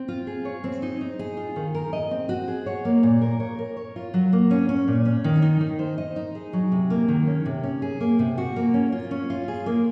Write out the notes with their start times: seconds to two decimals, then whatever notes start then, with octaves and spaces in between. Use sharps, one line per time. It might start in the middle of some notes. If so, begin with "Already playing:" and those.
Already playing: C4
0.08 F4
0.27 G#4
0.45 C#5
0.64 C4
0.82 D#4
1.01 D#4
1.19 G#4
1.37 F4
1.56 D#3
1.74 A#4
1.93 D#5
2.11 C4
2.29 F#4
2.48 G#4
2.66 C#5
2.85 A#3
3.03 A#2
3.21 A#4
3.40 C#5
3.59 A#4
3.77 C#5
3.96 F4
4.14 F#3
4.33 A#3
4.51 C#4
4.69 C#4
4.88 A#2
5.05 C#4
5.24 D#3
5.42 D#4
5.61 D#3
5.79 C5
5.98 D#5
6.16 D#4
6.35 G#4
6.53 F#3
6.72 C3
6.90 A#3
7.08 D#3
7.27 C#4
7.46 C3
7.63 C#4
7.82 G#4
8.00 A#3
8.19 C3
8.38 F#4
8.56 A#3
8.74 C#4
8.92 F4
9.11 C#4
9.30 F4
9.48 G#4
9.66 A#3